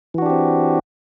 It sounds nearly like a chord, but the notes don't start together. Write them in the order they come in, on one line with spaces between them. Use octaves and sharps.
E3 F#4 D4 G4 C4